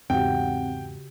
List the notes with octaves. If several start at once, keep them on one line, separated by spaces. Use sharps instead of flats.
E2 G#2 C#3 C4 F#4 G4 F#5 G5